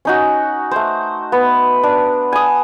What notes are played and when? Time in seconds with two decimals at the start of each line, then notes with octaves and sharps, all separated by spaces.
0.05 C#4 D#4 F#4
0.71 A3 C5
1.32 B3
1.83 D4
2.32 G#5 D#6